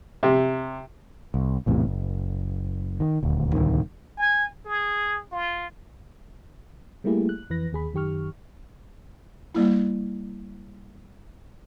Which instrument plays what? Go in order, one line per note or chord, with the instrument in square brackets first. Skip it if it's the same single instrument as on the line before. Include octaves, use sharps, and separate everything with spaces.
[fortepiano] C3
[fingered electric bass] C2
A#1 E2 A2 C3
F#1
D#3
D#1 D2
D1 G1 C2 D#3
[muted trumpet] G#5
G#4
F4
[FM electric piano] G3 A3 A#3 E4 G4 G#4
F#6
F2 E3 B4 F#6 A#6
D#2 G#4 B5
F#2 D#3 G4 C#6 F6
[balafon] G3 A#3 E4